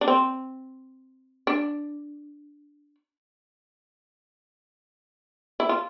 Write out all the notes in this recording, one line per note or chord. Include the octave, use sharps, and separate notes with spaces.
D4
C4
D4
E4
F4